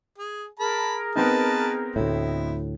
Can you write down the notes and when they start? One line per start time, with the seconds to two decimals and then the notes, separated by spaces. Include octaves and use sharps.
0.18 G#4
0.60 G#4 A#4 A5 B5
1.16 B3 C4 D#4 B4 A5
1.96 D2 A2 E4